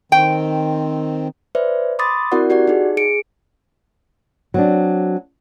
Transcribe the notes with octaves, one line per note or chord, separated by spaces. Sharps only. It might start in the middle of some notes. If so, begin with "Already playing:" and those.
D#3 C4 G5
B4 C5 D5 E5
B5 C6 D6 D#6 A6
C4 E4 F#4 A#4 D5 F#5
F#4 G4 D5 F#5
D#4 G#4
G#4 C#7 D7
F#3 C4 D4